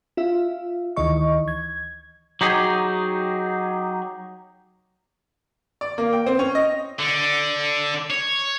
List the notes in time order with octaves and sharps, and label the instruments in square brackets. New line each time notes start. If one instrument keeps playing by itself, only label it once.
[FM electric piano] F4 E5 F5
D2 D#3 E3 D#5 C#6
G#6
[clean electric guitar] F#3 D#4 G4 G#4
[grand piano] D5
A#3
G5
C4
C#4
D#5
[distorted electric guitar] D3
C#5